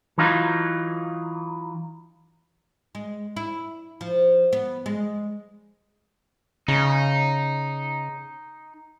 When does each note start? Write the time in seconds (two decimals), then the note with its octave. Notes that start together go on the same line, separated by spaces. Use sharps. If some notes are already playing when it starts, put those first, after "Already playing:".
0.18 E3 F#3 D#4 F4
2.95 G#3
3.36 E4
4.01 F3
4.53 B3
4.86 G#3
6.68 C#3 D#4